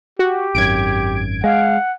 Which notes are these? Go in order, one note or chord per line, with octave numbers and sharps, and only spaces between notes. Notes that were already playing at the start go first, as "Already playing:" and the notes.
F#4 G4
G#1 F#2 G#6 D7
G#3 F5 F#5